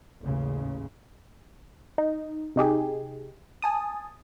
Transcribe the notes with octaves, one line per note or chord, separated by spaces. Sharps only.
A1 D#2 C#3
D#4
C3 D#4 G4 G#4
G#5 A5 D#6